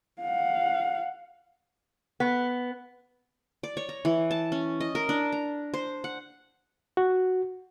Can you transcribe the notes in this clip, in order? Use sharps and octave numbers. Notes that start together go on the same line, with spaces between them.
F5 F#5
B3
D5
C#5
A#5
E3
A5
C#4
D#5
A#4
D4
A#5
C5
F#5
F#4